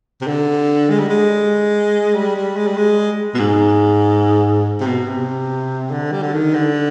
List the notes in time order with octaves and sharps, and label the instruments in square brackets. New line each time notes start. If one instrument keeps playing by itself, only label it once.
[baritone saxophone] C3
D3
G#3
G3
G#3
G3
G3
G#3
G3
G#3
B2
G#2
C3
B2
C3
D3
G3
D3
D#3
D3